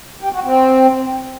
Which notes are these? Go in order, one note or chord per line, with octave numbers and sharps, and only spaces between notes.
G4
F#4
C4